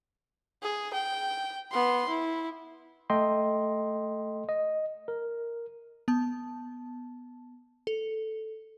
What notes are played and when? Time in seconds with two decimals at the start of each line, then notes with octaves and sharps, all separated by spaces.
0.63 G#4
0.94 G5
1.71 B3 C6
2.09 E4
3.10 A3 A4 D#5 G5 C6
4.49 D#5
5.08 A#4
6.08 B3 A5
7.87 A4